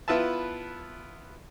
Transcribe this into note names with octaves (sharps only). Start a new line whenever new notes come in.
B3 E4 F4 B4 E5 A5